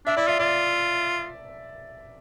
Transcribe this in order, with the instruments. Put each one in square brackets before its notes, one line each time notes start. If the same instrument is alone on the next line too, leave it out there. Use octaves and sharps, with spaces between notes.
[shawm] D4 [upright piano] E5
[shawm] E4 [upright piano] D5
[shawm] F4 [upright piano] E5
[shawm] F4 [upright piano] D5